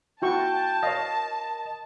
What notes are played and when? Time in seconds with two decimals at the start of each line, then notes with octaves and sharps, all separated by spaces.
0.22 E4 F#4 G5 A5 C#6
0.83 A#4 C#5 D#5 F5